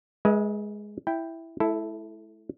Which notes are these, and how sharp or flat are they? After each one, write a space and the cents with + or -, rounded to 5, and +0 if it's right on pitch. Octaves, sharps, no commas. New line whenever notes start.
G#3 +0 B4 -30 E5 -35
E4 +0 G5 +0
A3 -45 E4 +0 A4 +0